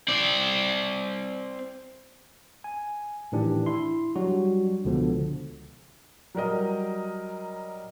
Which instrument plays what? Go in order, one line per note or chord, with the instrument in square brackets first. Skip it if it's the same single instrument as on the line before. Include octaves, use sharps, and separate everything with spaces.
[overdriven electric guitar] C4 D5
[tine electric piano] G#5
A2 D#3 E3 D4 G4
E4 C6
F#3 G3 D4 F#4
C#2 B2 D3 F3 B3
[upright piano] F#3 G3 A#4 D#5